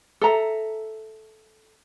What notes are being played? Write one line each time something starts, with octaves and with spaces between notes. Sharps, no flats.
A4 E5 A#5